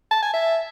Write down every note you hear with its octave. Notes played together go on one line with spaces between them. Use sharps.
A5
G#5
E5